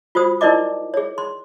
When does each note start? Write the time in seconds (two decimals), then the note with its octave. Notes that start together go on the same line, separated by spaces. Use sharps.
0.15 F4 F#4 C5 D#6
0.41 D#4 E4 A#4 D5 D#5 D6
0.94 G#4 C#5
1.18 C6